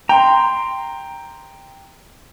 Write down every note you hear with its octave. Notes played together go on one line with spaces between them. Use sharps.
G5 A#5 C6